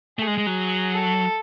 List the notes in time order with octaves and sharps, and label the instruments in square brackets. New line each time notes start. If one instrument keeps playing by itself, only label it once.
[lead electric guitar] A3 [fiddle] G#4
[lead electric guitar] G#3
G#3
F#3
[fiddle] A4